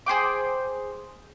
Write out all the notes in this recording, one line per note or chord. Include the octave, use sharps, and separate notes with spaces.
G#4 C5 G5 D6